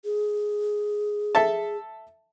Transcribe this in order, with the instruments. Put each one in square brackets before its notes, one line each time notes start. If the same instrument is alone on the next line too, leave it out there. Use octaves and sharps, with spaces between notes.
[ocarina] G#4
[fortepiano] A4 E5 A5